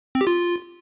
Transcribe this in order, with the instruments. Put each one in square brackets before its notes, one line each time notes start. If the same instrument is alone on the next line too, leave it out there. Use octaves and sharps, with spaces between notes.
[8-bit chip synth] C4
G4
F4